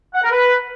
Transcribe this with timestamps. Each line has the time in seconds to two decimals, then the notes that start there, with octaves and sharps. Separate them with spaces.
0.14 F#5
0.23 A#4
0.32 B4